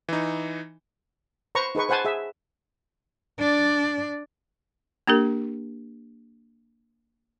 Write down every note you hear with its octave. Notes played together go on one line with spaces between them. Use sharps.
E3 D#4
B4 C5 A#5 C#6
D#4 G#4 B4 C#6
B4 C5 F#5 G#5 A5
G#4 E5
D4 D5
A#3 D4 G4 A#4